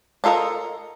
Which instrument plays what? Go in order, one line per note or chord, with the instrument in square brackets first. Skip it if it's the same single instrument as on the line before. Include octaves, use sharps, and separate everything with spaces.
[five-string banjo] D4 F4 A4 A#4 D#5